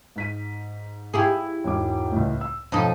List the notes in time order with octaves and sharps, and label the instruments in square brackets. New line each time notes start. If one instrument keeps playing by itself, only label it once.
[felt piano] G#2 B6 D#7
[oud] E4 G4 G#4
[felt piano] E1 G#2 D6
C#2 A2
E6
[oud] F2 B2 D#4 [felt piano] A5